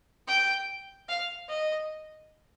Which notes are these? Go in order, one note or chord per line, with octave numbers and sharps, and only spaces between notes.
G5
F5
D#5